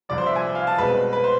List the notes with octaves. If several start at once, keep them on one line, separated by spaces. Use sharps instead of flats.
C2 C3 F3 D5
C5
E5
G#5
F5
A5
C2 B2 G#3 C4 B4
B4
C5